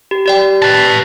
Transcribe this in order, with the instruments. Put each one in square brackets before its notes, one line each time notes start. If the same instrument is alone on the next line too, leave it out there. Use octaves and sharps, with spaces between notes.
[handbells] G4
G4 D5 G5
[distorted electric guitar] B4 A5